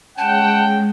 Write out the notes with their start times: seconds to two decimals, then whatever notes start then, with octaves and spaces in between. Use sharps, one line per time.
0.18 G#3 C#4 F#5 G5 A5